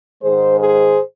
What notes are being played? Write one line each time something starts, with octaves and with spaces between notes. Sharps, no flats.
G#2 D#3 G#3 G#4 C5
G#4 C5